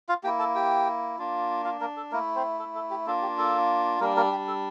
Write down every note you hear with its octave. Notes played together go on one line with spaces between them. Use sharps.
F4 F5
A#3 E4 G4 G5
A4 A5
G4 G5
A#3 D4 F4
F4 F5
A#3 A#4
A4
A3 A#3 E4 A#4
C4 C5
A4
A4
G4
A#3 D4 F4 A4
G4
A4
G3 A#3 D4 A#4
A#3 A#4
G4
A4